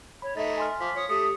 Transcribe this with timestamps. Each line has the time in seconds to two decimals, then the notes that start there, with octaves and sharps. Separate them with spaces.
0.22 C#5 B5
0.37 A3 D#4 E5 A6
0.57 G#5 C6 F6
0.81 F3 D6 B6
0.96 C#5 D#6
1.10 A3 G4 D#6 C#7